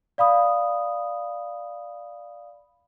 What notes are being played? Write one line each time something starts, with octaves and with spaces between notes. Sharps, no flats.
D5 F5 B5 D#6